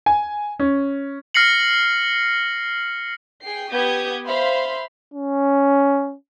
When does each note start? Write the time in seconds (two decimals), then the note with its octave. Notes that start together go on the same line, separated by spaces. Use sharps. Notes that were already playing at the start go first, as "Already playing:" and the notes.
0.06 G#5
0.59 C#4
1.34 F6 A#6 C7 C#7 F#7
3.42 G#4 G5 C7
3.71 B3 G4 D#6 G6 G#6
4.26 C5 E5 F5 B5 C6
5.14 C#4